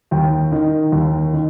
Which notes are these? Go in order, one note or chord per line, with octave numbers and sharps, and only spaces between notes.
D#2 G5
D#3
D#2
D#3